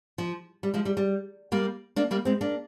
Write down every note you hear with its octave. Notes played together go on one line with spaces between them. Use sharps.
F3
G3
F3 G#3
G3
G3
G3 A#3
A#3 D4
G3 A#3
G#3 C4
A#3 D4